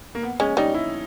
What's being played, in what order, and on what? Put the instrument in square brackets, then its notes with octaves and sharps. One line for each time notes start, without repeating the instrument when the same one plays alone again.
[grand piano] A#3
B3
[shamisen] G#3 [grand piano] C#4
[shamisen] G3 [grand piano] D#4
[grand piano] E4